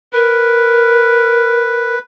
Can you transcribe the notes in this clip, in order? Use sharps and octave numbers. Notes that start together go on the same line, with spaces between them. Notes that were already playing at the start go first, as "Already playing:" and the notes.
A#4 B4